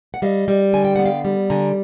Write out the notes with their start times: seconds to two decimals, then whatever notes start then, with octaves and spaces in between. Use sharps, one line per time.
0.14 F#5
0.22 G3 D#5 F5
0.48 G3
0.73 D3 G#5
0.85 G5
0.96 B3 F#5
1.06 F5 G5
1.25 G3
1.50 D3 G#5 A#5